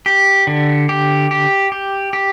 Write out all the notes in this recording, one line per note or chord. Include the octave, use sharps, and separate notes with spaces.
G4
D3
G4
G4
G4
G4